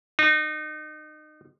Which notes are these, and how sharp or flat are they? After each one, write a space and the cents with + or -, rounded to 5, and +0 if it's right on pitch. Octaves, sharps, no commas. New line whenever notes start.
D#4 -30